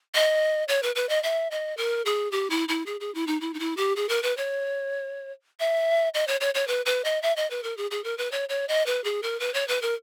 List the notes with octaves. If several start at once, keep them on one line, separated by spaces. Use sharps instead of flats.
D#5
C#5
B4
B4
D#5
E5
D#5
A#4
G#4
G4
E4
E4
G#4
G#4
E4
D#4
E4
D#4
E4
G4
G#4
A#4
B4
C#5
E5
D#5
C#5
C#5
C#5
B4
B4
D#5
E5
D#5
B4
A#4
G#4
G#4
A#4
B4
C#5
C#5
D#5
B4
G#4
A#4
B4
C#5
B4
A#4